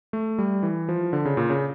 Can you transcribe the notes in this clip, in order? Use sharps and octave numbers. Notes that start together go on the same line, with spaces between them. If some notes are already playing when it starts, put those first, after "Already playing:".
A3
G3
E3
F3
D3
C#3
A#2
C#3